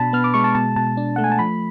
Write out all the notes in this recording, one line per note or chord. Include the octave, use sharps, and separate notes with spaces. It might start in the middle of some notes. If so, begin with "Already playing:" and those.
Already playing: B2 D4 A5 B5
B3 F6
D6
G#3 C#6
A5
B2 A5
B2 A5
D4
A3 F#5
G#5
A5
F3 B5